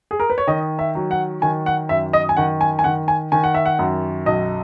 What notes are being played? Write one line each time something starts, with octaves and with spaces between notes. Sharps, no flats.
G#4
A#4
B4
C#5
D#3 D#5
E5
F#3
F#5
D#3 G#5
F#5
F#2 E5
D#5
G#5
D#3 F#5
G#5
G#5
D#3 F#5
G#5
D#3 G#5
F#5
E5
F#5
F#2
B1 D#5